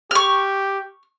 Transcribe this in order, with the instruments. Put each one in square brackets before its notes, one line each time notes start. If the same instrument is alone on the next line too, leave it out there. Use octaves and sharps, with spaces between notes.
[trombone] G4 [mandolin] C#6 F6